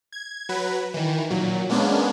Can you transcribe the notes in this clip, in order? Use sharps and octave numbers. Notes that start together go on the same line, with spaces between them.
G#6
F#3 B4
D#3 E3
A#2 F#3
G#3 A#3 B3 C#4 D4